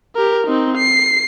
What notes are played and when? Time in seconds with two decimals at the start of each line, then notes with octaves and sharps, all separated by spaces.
0.15 G4 A#4
0.47 C4 D#4
0.77 C7